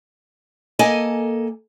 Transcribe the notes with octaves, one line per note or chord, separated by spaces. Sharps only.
A#3 A4 D#5 G#5